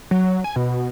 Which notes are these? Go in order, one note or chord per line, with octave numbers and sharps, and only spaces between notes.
F#3
G#5
B2